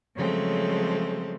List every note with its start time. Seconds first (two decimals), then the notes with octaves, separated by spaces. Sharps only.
0.16 C#3 F3 F#3 G#3 A3 C4